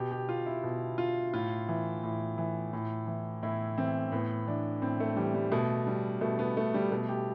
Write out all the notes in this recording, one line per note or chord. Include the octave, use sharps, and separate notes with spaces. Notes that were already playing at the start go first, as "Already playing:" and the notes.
Already playing: B2 G4
G4
F4
E4
B2
F4
A2 F4
E3
A2
E3
A2
E3
A2 E4
E3 C4
A2 B3
E3 D4
A2 C4
A3
E3 G3
G3
B2 A3
G3
B2 A3
B3
A3
G3
B2 A3
G4